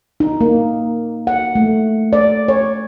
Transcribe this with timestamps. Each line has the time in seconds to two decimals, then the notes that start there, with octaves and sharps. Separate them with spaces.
0.20 D#4
0.41 A#3
1.27 F#5
1.55 A3
2.13 D5
2.48 C#5